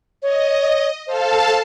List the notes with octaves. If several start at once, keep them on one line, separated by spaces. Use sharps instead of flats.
C#5 D#5
A4 C5 F5 A5